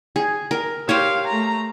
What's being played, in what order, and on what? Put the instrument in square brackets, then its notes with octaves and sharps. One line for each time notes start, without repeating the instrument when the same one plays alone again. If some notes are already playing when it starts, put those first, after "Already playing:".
[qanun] G#4
A#4
[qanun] G4 C5 C#5 [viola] F5
[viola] A3 A#5